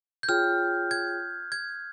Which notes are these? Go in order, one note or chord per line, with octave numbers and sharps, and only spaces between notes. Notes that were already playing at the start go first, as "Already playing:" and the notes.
G6
F4 G#4 C#5 G5 F6
G#6
G#6